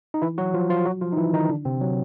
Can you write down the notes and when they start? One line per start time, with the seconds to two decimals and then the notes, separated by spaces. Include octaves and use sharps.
0.14 D#4
0.22 E3 E4
0.38 F#3 F#4
0.54 F3 F4
0.70 F3 F4
0.85 F#3 F#4
1.01 F3 F4
1.12 D#4
1.17 E3 E4
1.33 D#3 D#4
1.49 D3 D4
1.65 C3 C4
1.81 F#3